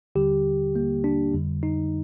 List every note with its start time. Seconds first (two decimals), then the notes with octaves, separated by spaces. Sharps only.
0.15 D#2 D3 G3 G4
0.76 A#3
1.04 D4
1.33 F2 D3 G3
1.63 D#4